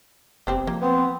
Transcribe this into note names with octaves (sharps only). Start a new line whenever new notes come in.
F#1 B3 C4 G4
F3 A#3
B3 C4